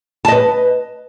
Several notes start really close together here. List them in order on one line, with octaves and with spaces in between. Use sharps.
A5 D#5 B4